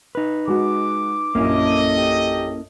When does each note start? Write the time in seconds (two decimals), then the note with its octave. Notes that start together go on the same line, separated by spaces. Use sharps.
0.15 D#4 B4
0.48 G#3 F#4 D6
1.35 A#1 F#2 A#3 C#4 E4 A4 D#5
1.97 G4